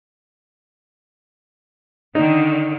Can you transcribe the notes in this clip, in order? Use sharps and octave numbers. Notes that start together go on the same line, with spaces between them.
D3 D#3 D#4